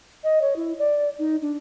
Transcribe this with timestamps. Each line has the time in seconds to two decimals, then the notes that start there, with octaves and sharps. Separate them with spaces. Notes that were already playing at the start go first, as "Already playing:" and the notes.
0.24 D#5
0.42 C#5
0.56 E4
0.79 D5
1.19 D#4
1.42 D4